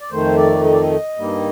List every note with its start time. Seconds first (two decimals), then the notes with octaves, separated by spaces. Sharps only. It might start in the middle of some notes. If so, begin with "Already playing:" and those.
0.01 D5
0.11 F2 D#3 A3 C5
0.37 D5
0.64 D#5
0.73 D5
0.81 D#5
1.17 G2 D#3 G3 A#3